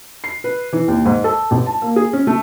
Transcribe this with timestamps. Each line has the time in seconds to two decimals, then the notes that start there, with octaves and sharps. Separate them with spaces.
0.24 C7
0.44 B4
0.73 E3
0.88 D#2
1.06 G#2
1.24 A4
1.51 A1
1.66 A5
1.82 A#3
1.96 G#4
2.13 C#4
2.27 A3